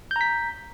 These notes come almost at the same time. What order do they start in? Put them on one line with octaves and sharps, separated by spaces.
G6 A#5 B6